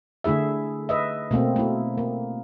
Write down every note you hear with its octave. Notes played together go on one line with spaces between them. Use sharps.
D3 A3 E4 G#4 E5
B4 D#5 E5
B2 A3 A#3 C4
A3 E4
A#3